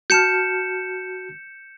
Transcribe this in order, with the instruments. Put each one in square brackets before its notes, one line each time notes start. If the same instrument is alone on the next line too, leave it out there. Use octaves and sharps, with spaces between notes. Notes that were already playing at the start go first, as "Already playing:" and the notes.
[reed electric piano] F#4 A5 F6 [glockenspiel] G6 C#7 E7